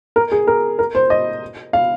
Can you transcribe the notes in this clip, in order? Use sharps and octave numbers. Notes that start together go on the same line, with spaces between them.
A#4
G#4
A#4
A#4
C5
D#5
F5